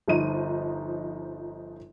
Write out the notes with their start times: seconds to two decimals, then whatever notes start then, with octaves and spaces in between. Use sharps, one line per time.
0.08 G1 F3 D#4 D#7